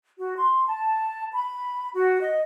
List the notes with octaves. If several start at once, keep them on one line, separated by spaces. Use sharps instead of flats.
F#4
C6
A5
B5
F#4
D#5